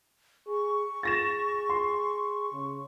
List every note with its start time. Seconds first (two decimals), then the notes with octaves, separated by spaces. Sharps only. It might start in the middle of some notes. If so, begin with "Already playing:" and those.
0.47 G#4 C#6
1.03 G#4 A6 A#6 E7
1.69 C6
2.53 C#3